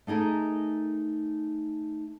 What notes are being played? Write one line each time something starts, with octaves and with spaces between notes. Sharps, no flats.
A3 D#4 G#4 A#4 D#5